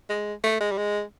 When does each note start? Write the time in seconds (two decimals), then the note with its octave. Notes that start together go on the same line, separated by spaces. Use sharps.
0.09 G#3
0.44 A3
0.60 G#3
0.72 G3
0.78 G#3